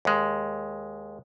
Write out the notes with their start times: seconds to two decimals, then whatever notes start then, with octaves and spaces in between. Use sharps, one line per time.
0.05 D#2 G#3